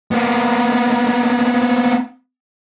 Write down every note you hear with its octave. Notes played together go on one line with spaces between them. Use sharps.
A#3 B3